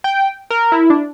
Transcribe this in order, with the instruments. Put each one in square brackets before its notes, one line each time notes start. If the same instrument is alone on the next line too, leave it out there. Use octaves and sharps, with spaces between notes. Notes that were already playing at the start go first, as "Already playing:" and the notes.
[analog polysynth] G5
A#4
E4
D4